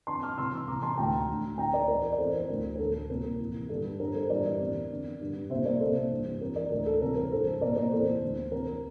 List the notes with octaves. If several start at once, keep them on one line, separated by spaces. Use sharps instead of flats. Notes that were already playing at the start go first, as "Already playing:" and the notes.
F2 D3 A5 C6
D6 F6
C2 C3 E3 C6 E6
C2 C3 E3 A#5 D6
A5 C6
D2 D3 G5 A#5
D2 D3
D2 D3 G5 A#5
A#4 D5
E2 E3 A#4
D5
F2 E3 A4 C5
A#4
D2 D3
A#4
D2 D3 A4
C2 A#2 A#4
F2 C3 E3
G2 D3 A4
G2 D3 A#4
A4 C5
G2 E3 A#4 D5
E2 C3 E3
F2 D3
G2 D3
C2 A#2 C5 E5
A#4 D5
C2 A#2 A4 C5
G2 E3
F2 E3 A#4
A#4 D5
D2 D3 A#4
A4
C2 C3 E3 A#4
A#4
G2 E3 A4 C5
C2 A#2 A#4 D5
A#4 D5
E2 C3 E3 A4 C5
D2 D3
F2 C3 E3 A#4